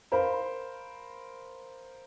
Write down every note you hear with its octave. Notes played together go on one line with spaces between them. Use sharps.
A#4 C5 F5 B5